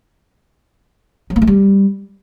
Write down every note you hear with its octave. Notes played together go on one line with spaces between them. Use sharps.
F#3
A#3
A3
G3